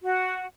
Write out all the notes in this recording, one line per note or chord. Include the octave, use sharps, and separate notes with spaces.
F#4